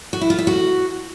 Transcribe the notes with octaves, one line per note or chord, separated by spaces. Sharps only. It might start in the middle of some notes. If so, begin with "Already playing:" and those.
F#4
E4
F4
E5
F#4